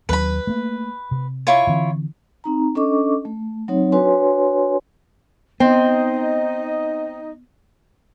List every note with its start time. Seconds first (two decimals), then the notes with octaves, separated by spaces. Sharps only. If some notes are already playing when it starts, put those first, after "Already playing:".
0.09 D#2 F#3 B4 B5
0.47 A3 A#3
1.11 C3
1.47 E4 F4 C#5
1.67 D3 E3 C4
2.44 C4 D#4 A#5
2.75 C#4 D4 A4 D#5 C#6 D6
3.25 A3
3.68 F#3 C4 D#4 C#5
3.92 D4 F#4 B4 C#5 G#5 C6
5.60 B3 C4 D#4 D#5